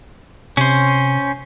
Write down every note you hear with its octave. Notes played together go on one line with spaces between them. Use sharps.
C3 C#4 C5